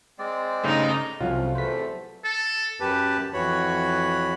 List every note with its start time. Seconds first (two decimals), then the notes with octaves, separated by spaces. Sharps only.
0.19 G#3 C4 D5
0.64 G2 C#3 A3 D#4 A#5
1.20 C2 F2 F#3 A3 C#4 F4
1.55 E2 C3 A3 B4 C5 B6
2.25 A4
2.80 F#2 G4 B4 A5
3.34 F2 E3 F#4 C#5 B5